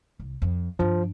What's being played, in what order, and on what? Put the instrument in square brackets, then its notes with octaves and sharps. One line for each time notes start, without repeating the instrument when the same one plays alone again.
[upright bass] C2
F2
[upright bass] G2 D4 [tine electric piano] F3